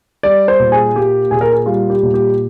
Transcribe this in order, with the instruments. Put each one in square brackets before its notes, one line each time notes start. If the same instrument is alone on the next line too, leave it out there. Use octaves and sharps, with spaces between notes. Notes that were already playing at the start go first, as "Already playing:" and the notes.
[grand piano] G3 D5
C5
A#2
G#4
A#3 G4
A#2 G#4
A#4
G#4
G3 F4
G4
A#2
G4